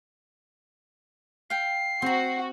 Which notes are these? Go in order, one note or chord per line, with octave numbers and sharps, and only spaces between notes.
F5 G5 C7
C4 F#4 A#5